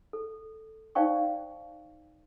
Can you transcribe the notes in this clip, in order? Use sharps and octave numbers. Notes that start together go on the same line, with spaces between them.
A4
D#4 C5 D5 F5 G5 C#6